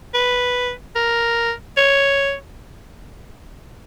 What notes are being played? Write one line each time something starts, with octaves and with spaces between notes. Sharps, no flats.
B4
A#4
C#5